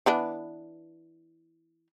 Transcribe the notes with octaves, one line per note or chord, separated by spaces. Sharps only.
E3 B3 D4